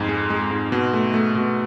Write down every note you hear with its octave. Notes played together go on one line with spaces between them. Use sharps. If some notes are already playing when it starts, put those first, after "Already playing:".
Already playing: F2 G#2
G#3
G#3
G#2
B2
A3
A3
B2